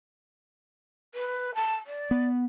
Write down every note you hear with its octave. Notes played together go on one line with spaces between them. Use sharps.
B4
A5
D5
B3